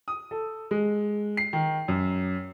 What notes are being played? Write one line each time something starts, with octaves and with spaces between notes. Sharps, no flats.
D#6
A4
G#3
C7
D#3
F#2